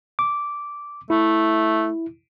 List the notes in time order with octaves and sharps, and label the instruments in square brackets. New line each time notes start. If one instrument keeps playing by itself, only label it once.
[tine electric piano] D6
[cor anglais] A3 [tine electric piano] E4